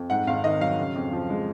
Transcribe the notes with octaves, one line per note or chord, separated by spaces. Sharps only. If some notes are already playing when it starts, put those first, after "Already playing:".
Already playing: F2
G#2 F#5
G#1 F5
D#3 D#5
F#3 F5
C#3
F2
F3
G#3